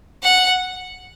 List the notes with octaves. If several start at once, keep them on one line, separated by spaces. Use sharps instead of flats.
F#5